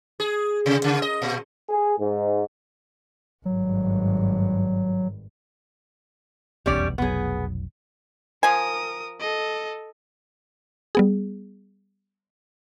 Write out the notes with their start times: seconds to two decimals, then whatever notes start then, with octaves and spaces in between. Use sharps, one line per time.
0.20 G#4
0.66 C3
0.84 C#3
1.02 D#5
1.22 A#2
1.70 G#4
1.99 G#2
3.45 G#1 G2 F#3
6.66 F1 B1 E2 G3 C#4 D5
6.98 F1 B1 F#3 B3 G#4
8.43 F3 A#4 G#5 D#6
9.20 A4 D#5
10.95 G3 B3 G#4